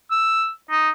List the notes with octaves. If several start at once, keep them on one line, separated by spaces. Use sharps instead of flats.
E6
D#4